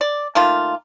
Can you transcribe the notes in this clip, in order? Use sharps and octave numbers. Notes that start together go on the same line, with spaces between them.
D5
D#3 A3 A#3 F4